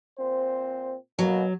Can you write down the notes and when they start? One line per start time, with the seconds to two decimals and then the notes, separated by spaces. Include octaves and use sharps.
0.18 A#2 C4 C5
1.19 B2 F#3 A#3